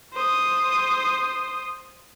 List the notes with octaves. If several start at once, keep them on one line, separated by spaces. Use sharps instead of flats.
C5 D#6